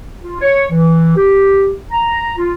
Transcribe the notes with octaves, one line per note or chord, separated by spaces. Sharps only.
F4
C#5
E3
G4
A#5
F4